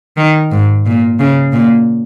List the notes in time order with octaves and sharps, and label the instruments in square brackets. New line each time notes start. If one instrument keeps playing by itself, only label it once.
[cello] D#3
G#2
A#2
C#3
A#2